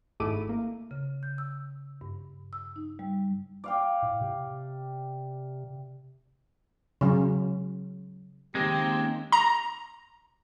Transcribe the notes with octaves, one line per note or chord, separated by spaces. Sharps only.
G#1 G#2 A3 E4 D6 D#7
A#3
C#3
G6
E6
G2
E6
D#4
G3
D5 F5 G5
A2
C3
C#3 F#3
D#3 G#3 A#3 C4 G4
A#5